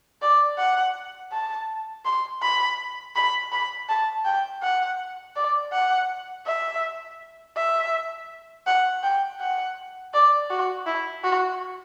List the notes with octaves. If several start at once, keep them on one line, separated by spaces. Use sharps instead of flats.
D5
F#5
A5
C6
B5
B5
B5
A5
G5
F#5
D5
F#5
E5
E5
F#5
G5
F#5
D5
F#4
E4
F#4